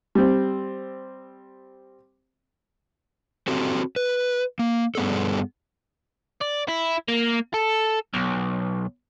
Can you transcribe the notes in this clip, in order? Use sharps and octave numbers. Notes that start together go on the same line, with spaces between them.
G3 C4
C4 F#4 G4 A4
B4
A#3
G2 G3 B3 G#4 A4
D5
E4
A#3
A4
B1